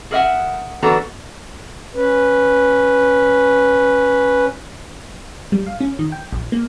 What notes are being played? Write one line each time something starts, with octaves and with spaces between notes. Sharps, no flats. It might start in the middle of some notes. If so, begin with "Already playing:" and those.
G#4 A#4 E5 F#5
E3 B3 D4 F#4 A4 A#5
C#4 B4
G3
F5
C#4
D#3
G5
A#1
A#3